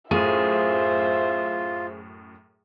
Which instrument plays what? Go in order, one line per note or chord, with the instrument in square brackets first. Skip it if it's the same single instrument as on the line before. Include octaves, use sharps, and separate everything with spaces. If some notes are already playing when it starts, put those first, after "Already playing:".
[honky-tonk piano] F#2 A2 D#7 [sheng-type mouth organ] F4 [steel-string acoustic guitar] G#4 [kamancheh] C5 E5